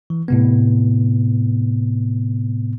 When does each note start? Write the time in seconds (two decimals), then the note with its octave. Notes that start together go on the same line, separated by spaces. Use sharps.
0.10 E3
0.28 A2 C3 B3